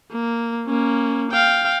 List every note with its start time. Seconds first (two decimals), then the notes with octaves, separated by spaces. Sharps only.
0.11 A#3
0.66 A#3 C#4
1.31 F5 G5